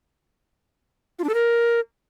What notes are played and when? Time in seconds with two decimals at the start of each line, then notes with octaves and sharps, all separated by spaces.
1.19 F4
1.24 D4
1.29 A4
1.34 A#4